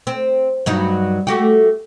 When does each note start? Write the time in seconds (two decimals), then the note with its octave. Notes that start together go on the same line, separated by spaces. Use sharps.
0.07 C4
0.66 G2 F#3 D#4
1.27 A3 F#4 G4